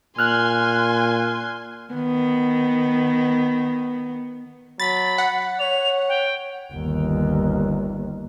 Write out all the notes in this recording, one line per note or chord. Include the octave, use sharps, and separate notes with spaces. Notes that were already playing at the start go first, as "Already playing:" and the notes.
A#2 G#5 C6 F6 F#6
D#3 B3
F#3 B5 A6
F#5
C#5 F7
G5
G1 D#2